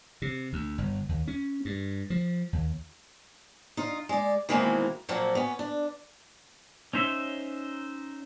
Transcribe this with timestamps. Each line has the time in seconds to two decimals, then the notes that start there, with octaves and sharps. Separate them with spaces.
0.22 C3
0.53 D2
0.78 G1
1.09 D#2
1.28 C#4
1.65 G2
2.10 F3
2.53 D#2
3.77 D#4 F4
4.09 G#3 D5
4.49 B2 D#3 E3 G#3 A#3 C4
5.09 A#2 F3 F#3 A#3 C4
5.35 B3 C#4
5.59 D4
6.93 C#4 D#4 C5 E5